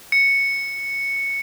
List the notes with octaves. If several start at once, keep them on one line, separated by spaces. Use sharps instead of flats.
C#7